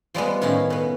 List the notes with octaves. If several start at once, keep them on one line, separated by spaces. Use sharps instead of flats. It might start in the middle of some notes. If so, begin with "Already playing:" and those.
F3 G3 G#3 B3
A2 D#3 C#4 E4 F5
B2 B3